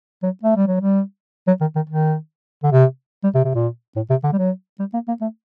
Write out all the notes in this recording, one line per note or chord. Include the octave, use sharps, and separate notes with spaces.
F#3
A3
G3
F#3
G3
F#3
D#3
D#3
D#3
D3
C3
G3
C3
C3
A#2
A2
C3
D3
G3
F#3
G3
A#3
A#3
A3